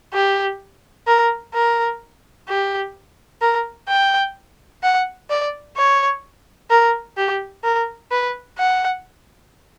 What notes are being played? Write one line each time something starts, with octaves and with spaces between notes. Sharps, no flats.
G4
A#4
A#4
G4
A#4
G5
F#5
D5
C#5
A#4
G4
A#4
B4
F#5